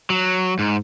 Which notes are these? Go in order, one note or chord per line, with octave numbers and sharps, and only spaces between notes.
F#3
G#2